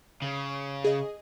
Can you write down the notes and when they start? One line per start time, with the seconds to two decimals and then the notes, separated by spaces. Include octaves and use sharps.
0.22 C#3
0.84 G#4 D#5